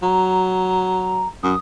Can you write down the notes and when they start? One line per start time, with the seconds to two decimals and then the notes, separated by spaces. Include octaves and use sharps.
0.02 F#3 A#5
1.43 F#2 D#6